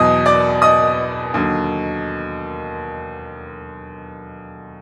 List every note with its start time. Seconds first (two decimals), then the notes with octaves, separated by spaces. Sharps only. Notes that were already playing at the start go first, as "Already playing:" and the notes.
Already playing: E2 B2 F#3 D#5 D#6
0.26 D5 D6
0.62 D#5 D#6
1.34 D#2 D3 F#3